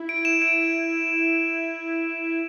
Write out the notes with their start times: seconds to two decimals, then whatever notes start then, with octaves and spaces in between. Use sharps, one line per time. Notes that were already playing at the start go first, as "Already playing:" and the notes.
Already playing: E4
0.09 D7
0.25 E7
0.42 D7